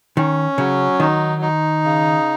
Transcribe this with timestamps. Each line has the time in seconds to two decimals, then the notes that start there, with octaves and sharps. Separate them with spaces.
0.17 D#3 C#4
0.58 C#3 F#3
1.00 D#3 D#4
1.41 D#4
1.84 C#3